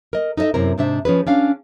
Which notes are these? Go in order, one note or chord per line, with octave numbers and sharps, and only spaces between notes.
A#4 D#5
D#4 A4 C5 D#5 E5
F#2 C3 C4 E4 A#4
G#2 C3 D4 C5 E5
F3 C#4 G#4 B4
C#4 D4 F5